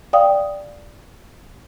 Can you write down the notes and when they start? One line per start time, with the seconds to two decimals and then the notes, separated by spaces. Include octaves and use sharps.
0.13 D5 F5 G5 D#6